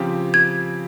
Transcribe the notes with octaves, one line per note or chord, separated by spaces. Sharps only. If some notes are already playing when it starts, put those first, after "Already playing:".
Already playing: C#3 F3 C4 G4
G#6